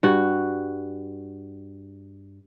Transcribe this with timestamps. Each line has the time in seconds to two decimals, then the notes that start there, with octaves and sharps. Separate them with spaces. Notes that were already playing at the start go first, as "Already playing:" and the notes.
0.03 G2 F#4